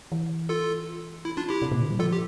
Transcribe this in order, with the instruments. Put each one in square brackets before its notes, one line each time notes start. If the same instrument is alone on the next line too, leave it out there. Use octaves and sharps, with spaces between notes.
[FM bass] E3
[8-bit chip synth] F4 A4
E4
D4 F4
E4 G4
[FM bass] C3
A#2
D3
G3
[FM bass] F3 [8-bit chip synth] F4 A4
[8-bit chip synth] G4